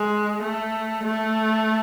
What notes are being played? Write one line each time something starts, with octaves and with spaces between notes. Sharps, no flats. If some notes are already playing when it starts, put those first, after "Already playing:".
Already playing: G#3
A3
A3